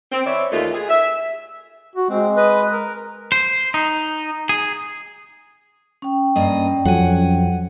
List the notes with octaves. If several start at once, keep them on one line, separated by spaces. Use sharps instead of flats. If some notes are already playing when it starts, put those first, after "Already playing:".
C4
E3 C#5 D5 E5
D#2 A3 A#3 F4 D#5
G#4
E5
F#4
G#3 C4
B4 D#5
A#4
C5
D#4
G#4
C#4 G5
G2 A#3 D#5
F2 F#3 F#5 G#5